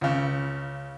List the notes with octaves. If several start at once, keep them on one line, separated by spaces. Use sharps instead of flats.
C#2 C#3